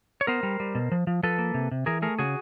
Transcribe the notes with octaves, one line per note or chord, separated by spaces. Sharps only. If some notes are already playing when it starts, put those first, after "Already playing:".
C#5
B3 A#4 C5
G3
G3
B2
F3
F3
F3 A4 B4
A#3
C3
C3
E3 G#4 A#4
A3 G#4 A#4
C#3 F#4 G#4